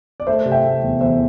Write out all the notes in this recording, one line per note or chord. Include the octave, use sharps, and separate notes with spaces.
D5
A3 C5 E5
C3
E5 G5
A3
E2
E2 C5 E5